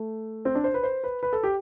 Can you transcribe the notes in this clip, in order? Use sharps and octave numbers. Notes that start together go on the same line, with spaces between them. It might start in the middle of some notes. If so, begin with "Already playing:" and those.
Already playing: A3
C4
D4
C5
B4
C5
B4
B4
A4
G4